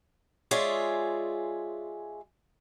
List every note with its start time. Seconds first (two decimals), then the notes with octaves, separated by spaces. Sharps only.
0.51 G#3 F4 G#4 C#5 D5 E5